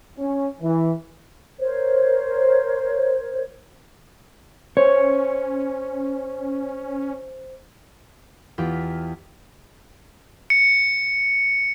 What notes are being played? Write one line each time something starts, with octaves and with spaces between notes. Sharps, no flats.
C#4
E3
A#4 C5 C#5
C#4 C5 C#5
E2 F4 G4 G5 B6
C#7